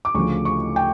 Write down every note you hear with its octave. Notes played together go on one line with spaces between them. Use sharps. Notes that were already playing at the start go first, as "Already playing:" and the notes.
D6
D2 C#3 F3 C#6
C#6
G5